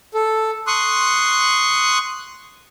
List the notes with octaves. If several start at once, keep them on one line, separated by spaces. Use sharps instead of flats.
A4
C6 C#6 D#6 F#6